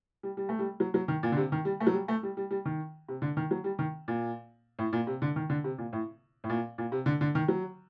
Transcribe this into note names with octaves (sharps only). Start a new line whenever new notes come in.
G3
G3
A3
G3
F#3
F#3
D#3
A#2
D3
C3
D#3
G3
A3
F#3
G3
A3
G3
G3
G3
D#3
C3
D3
D#3
F#3
G3
D#3
A#2
A2
A#2
C3
D3
D#3
D3
C3
A#2
A2
A2
A#2
A#2
C3
D3
D3
D#3
F#3